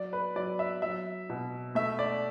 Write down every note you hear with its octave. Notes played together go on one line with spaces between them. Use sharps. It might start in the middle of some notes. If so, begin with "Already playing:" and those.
Already playing: F#3 D5
B4
F#3 D5
E5
F#3 E5
B2
A3 E5
D5